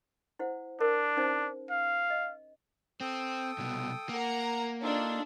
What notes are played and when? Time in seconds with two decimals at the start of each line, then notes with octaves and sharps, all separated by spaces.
0.39 E4 C5 F#5
0.81 D4 A#4
1.17 C#4 D#4 C5
1.70 F5
2.10 D#5
3.01 C4 A4 G5 D#6
3.58 C2 B2
4.09 A#3 A#4 F#5 A#5
4.83 D4 D#4 F4 A4